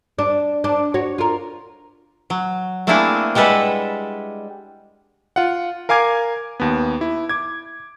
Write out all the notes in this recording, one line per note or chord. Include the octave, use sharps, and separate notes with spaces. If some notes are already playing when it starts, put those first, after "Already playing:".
D4
D4
F#4 C#5
F4 A#4
F#3
A3 A#3 C4 D4 E4 G#4
G3 G#3 A4 B4 E5 F#5
F4 F#5
A#4 F5 G#5 D6 G#6
D#2 B3
E4
D6 G#6